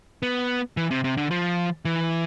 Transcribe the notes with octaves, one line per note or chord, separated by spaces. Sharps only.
B3
E3
C3
C3
D3
F3
E3